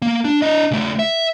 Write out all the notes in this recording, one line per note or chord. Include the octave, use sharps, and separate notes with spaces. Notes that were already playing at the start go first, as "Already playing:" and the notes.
A#3
D4
D4 D#5
C#3 A3
E5